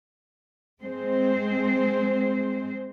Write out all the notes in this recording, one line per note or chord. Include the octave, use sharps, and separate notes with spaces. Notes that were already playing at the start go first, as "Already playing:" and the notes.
G#3 C4 C5